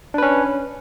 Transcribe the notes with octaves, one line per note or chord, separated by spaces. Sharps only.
C#4 D4 B4